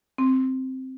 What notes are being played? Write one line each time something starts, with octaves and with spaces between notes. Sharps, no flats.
C4